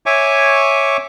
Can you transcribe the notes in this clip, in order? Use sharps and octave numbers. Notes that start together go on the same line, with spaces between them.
C#5 E5 G#5 C#6 D6